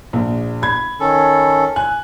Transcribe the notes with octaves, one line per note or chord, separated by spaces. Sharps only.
A#1
B5 G#6
D#3 C#4 A4
G#5 F#6